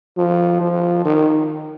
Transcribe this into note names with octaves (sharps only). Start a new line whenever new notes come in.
F3
F3
D#3